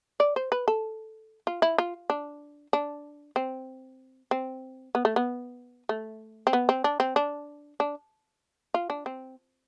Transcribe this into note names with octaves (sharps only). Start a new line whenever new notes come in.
D5
C5
B4
A4
F4
E4
F4
D4
D4
C4
C4
B3
A3
B3
A3
C4
B3
C4
D4
C4
D4
D4
F4
D4
C4